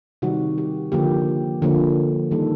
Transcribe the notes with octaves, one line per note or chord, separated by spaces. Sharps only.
C3 D#3 G3 F#4
G4
D3 F3 A#3 G4
D3 F3 A#3
D#3 G3 A#3 A4